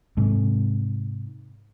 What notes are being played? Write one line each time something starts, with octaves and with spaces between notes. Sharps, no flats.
G#2 C3